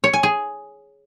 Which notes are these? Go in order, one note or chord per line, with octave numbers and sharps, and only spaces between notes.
C#5
G#5
G#4